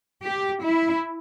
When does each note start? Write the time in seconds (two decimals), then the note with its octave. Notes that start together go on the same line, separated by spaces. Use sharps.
0.24 G4
0.63 E4